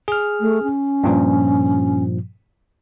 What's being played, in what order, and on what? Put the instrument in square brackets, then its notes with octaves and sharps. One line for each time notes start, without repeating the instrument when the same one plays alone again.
[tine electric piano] G#4 F6
[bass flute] A3
C#4
[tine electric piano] G2 A#2 F3